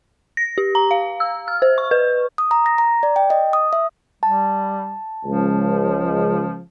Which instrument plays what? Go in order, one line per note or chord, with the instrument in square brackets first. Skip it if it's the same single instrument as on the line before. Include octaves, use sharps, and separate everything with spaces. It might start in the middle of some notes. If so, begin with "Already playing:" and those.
[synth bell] A#6
G4
A#5
F5
E6
F6
C5
C#6
B4
[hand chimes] D#6
A#5
A#6
A#5
D5
G5
D#5
D#6
E5
[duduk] G3 [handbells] A5
[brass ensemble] C#2 [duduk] F3